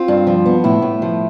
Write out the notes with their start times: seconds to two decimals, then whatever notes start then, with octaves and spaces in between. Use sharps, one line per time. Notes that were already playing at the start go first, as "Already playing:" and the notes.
Already playing: C4 F4
0.08 G2
0.27 F3
0.46 B3
0.64 A2 E4
0.82 A2
1.02 F3